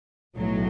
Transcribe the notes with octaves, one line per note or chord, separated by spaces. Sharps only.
B1 A2 F#3